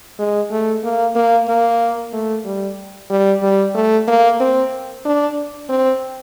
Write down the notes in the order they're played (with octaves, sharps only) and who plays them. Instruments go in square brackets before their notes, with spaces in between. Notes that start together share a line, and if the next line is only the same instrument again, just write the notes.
[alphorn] G#3
A3
A#3
A#3
A#3
A3
G3
G3
G3
A3
A#3
C4
D4
C4